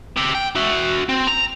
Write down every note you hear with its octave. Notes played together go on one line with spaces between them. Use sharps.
G4 E5
G5
F#4 E5
C4
A#5